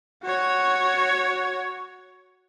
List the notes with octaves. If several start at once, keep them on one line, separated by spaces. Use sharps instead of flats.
F#4 C#5